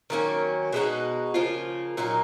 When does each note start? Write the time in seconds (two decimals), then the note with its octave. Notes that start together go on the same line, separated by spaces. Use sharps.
0.10 D#3 F#3 A#3 C#4
0.73 B2 G#3 D#4 F#4
1.34 C#3 F3 A#3 F4
1.97 A#2 F#3 A#3 D#4